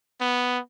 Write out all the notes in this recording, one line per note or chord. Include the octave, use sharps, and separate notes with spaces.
B3